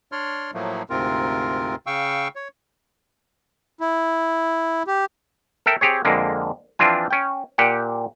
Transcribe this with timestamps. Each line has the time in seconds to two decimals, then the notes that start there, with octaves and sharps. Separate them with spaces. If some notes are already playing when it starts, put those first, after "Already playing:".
0.12 D4 C#5 D5 C6 F6
0.54 A2 F3 F#3 A3 A#3
0.90 D2 G#2 C3 C4 F4 A#4
1.86 C#3 F5 G5 C#6 E6
2.36 C#5
3.81 E4
4.87 G4
5.66 A4 A#4 E5 G5
5.81 C4 G4 G#4 C#5
6.05 F2 D3 G#3 A#3
6.79 E3 F3 C4 D4 F4 G#5
7.11 C#4 G5
7.58 A#2 G4 F#5 G5